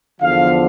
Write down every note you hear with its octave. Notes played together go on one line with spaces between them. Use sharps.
E2 D3 F3 F5